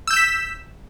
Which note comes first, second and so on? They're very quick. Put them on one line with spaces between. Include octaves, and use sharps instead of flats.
E6 G6 E7 B6